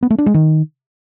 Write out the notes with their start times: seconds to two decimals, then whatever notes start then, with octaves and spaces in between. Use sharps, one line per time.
0.03 B3
0.10 A3
0.18 D4
0.26 G#3
0.34 D#3